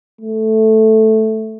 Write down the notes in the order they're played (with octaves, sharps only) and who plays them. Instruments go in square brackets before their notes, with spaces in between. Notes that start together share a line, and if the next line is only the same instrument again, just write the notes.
[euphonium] A3